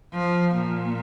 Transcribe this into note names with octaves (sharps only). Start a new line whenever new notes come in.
F3
A#2